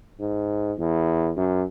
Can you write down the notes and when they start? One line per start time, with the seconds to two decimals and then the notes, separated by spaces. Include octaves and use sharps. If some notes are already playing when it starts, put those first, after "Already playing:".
0.20 G#2
0.78 E2
1.37 F#2